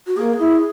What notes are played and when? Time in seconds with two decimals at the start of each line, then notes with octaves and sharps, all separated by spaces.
0.07 F#4
0.17 A#3 G#4
0.39 E4